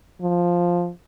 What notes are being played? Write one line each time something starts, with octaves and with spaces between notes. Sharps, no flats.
F3